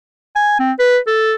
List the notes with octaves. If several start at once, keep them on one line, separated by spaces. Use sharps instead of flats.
G#5
C4
B4
A4